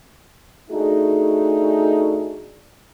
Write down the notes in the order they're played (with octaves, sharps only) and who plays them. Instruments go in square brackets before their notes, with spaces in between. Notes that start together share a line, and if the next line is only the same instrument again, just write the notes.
[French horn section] A3 D4 D#4 F#4 G#4